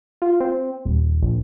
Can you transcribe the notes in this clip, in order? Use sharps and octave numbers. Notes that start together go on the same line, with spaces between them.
F4
C4
D#1
A#1